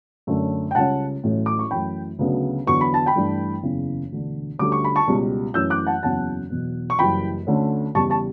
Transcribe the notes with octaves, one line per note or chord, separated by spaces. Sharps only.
F#2 D3 F#3 A3 C#4
G5
C#2 C#3 G3 C#4 F#5 A5
A1 A2 F#3 C#4
D6
C#6
F#2 E3 A3 G5 B5
D2 C#3 F#3 B3 D4
E2 D3 F#3 B3 C#6
B5
A5
G5 B5
G2 E3 A3 D4
F#1 E2 C#3 E3
E1 D2 D3
D2 D3 G3 C#4 D6
C#6
B5
A5 C#6
C#2 B2 G3
F#2 E3 A3 C#4 E6 G6
D6 F#6
F#5 A5
F#1 E2 C#3 F#3 C#4 F#5 A5
E1 E2 B2 F#3
C#6
F#1 F#2 E3 G3 G5 B5
D2 D3 A3 C#4
E2 C#3 G3 A5 C#6
A5 C#6